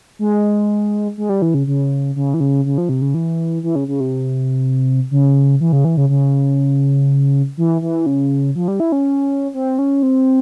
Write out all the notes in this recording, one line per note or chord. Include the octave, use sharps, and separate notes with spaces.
G#3
G#3
G3
E3
C#3
C#3
C#3
E3
C#3
C#3
F3
C3
C#3
E3
E3
C#3
C#3
C3
C#3
E3
C#3
E3
C#3
C#3
E3
E3
C#3
F3
G3
E4
C#4
C4
C#4
C4